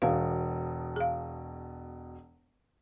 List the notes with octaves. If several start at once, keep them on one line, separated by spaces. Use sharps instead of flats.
E1 B2 B4 F5
G#4 F5